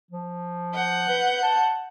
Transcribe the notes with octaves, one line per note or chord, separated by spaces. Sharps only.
F3
F#5 G6
B4
A5